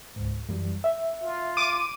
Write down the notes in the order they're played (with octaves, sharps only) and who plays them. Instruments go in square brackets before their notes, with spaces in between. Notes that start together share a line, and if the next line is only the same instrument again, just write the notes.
[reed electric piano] C#2 G#2
F#2 E3 G3
E5
[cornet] F4
[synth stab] D6 D#7